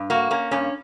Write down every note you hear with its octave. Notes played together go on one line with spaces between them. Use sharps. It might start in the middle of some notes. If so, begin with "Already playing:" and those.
Already playing: G2
A#3 F#4
A#3 C#4
G2 C#4